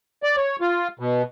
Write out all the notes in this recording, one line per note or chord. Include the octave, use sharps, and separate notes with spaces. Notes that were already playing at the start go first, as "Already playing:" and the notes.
D5
C#5
F4
B2